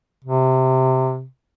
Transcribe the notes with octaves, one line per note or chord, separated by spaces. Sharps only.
C3